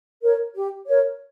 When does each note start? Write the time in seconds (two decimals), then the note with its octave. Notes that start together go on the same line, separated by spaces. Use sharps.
0.22 A#4 C#5
0.55 G4
0.87 A#4 C#5